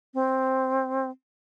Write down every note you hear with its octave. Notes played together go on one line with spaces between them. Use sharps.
C4